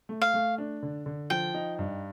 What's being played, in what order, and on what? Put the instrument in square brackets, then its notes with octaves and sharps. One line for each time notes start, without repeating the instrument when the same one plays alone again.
[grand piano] A3
[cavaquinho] F5
[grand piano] A3
D4
D3
D3
[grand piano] F3 [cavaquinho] G5
[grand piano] D#4
G2